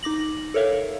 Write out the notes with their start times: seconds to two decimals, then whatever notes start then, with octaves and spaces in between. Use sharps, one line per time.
0.03 D#4 D6 A#6 F#7
0.54 A4 A#4 C#5 E5 F5